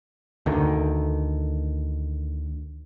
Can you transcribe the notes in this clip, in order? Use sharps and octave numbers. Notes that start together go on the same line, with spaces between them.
D2 D3 D#3